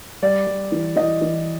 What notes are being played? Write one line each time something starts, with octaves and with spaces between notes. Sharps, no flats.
G3 D5
G3
E3
E3 D#5
E3